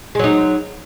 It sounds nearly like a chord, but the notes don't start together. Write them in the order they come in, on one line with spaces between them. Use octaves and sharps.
G#3 F#3 D#4